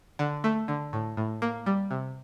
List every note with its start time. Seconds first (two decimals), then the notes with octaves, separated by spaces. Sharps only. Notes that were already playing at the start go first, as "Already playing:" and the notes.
0.19 D3
0.44 A3
0.68 D3
0.93 A2
1.17 A2
1.42 A#3
1.66 G3
1.91 C3